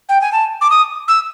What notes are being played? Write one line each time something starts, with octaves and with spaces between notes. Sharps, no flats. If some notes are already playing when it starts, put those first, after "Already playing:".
G5
G#5
A5
D6
D#6
E6